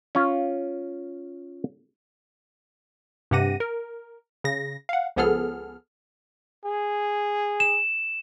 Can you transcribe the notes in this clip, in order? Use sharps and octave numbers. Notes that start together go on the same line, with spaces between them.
C#4 F4
G2 C3 G4 F#5 A#6 D#7
A#4
C#3 A#6
F5 F#5
C#2 F3 B3 G#4 A4 F6
G#4
E7